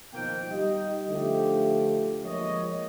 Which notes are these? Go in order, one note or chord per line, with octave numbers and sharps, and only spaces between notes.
B2 D#3 F3 A#3 G5
G3 D#4 G4 D#5
D3 F3 A3 G4
F3 G#3 A#3 C#5 D#5